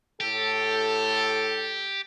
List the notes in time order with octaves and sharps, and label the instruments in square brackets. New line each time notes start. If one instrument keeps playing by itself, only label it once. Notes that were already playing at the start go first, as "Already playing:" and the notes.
[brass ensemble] A2 A4 [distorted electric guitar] G4